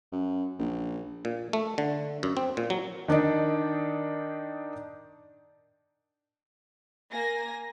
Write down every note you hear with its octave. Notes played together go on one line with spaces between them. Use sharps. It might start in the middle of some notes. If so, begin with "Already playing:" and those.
F#2
A#1
A#2
A3
D3
F#2
C4
A#2
F#3
D#3 D4 D#4 D5
A#3 G#5 A#6